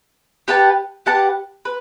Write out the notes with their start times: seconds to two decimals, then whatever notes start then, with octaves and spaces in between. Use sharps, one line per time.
0.48 G4 B4 F#5 A5
1.06 G4 B4 F#5 A5
1.65 B4